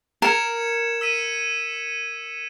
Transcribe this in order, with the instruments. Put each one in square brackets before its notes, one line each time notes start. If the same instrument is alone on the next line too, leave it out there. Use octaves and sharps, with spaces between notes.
[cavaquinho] A#4 [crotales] G#6 C#7 E7
[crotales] E6 B6 D#7